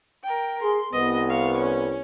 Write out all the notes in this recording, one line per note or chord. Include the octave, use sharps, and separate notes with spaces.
A#4 G5
G#4 C6
C2 B3 D#5
F5 C#6
C#4